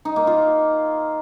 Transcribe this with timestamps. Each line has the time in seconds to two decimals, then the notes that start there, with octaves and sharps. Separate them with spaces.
0.05 D#4
0.16 A#3
0.27 F4